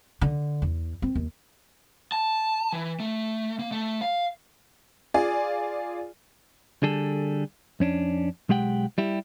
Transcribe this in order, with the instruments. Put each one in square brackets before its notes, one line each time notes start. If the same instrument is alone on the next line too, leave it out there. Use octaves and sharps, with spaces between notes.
[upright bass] D3
E2
C4
D#2
[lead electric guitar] A5
E3
A3
A#3
A3
F5
[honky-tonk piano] F4 G#4 D5
[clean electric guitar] D3 G3 G#4 A4
F2 C#4 D4
B1 G#3 G4 F#5 G5
G3 E4 G4